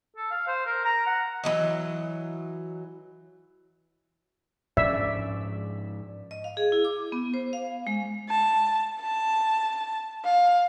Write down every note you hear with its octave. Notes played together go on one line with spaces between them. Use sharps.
A4
F5
C5
A#4
A#5
F#5
E3 F#3 D#5
G#2 F3 C#4 D5 E5
D#5
F5
G#4
E4
D6
B3
C5
F5
G#3
A5
A5
F5